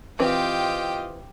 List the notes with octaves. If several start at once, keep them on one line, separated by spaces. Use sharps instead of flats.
E3 C4 F4 G4 B4 D#5 G5